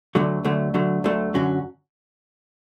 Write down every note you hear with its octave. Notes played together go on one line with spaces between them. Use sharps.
D2 D3 F#3 A3
D2 D3 F#3 A3
D2 D3 F#3 A3
D2 D3 F#3 A3
F#2 D3 F#3 C#4 F#4